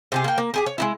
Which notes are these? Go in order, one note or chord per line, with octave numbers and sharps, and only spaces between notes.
C3 G4 G#4
A#3 G5
A#3
G4 G#4 G#5
C#5
G#3 D#4 E4